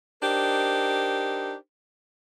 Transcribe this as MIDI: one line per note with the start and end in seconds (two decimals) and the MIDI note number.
0.22 1.54 62
0.22 1.54 63
0.22 1.54 67
0.22 1.54 70
0.22 1.54 72